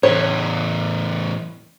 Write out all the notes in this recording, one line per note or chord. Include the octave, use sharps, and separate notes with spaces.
E2 A2 C#5